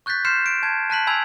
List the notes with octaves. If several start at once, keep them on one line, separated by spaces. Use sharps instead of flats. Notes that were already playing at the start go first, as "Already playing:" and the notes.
C#6 F#6 G6 A6 B6
C6 F6 G6 C7 C#7 E7
D7
A5 G#6
A5 F#6 B6 F#7
G#5 B5 E6 G#6